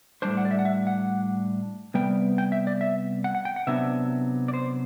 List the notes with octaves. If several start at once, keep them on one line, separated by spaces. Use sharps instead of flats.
A2 G3 D4 C5
F#5
D5
E5
F#5
E5
F#5
C3 G3 B3 G5
G5
E5
D5
E5
F#5
F#5
G5
F#5
C3 F#3 B3 D4 E5
D5
C5